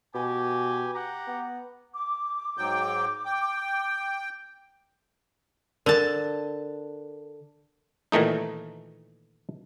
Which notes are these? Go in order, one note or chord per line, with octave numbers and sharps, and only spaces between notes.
B2 G4 G#5
G4 F#5 A#5
B3
D6
G#2 F#3 G5
G5
D3 A#4 A5
A#2 D#3 E3 A3 D#4